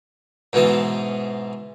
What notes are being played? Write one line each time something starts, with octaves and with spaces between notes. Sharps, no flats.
G#2 B2 E3 A5